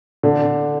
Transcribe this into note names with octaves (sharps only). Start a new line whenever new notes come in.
D3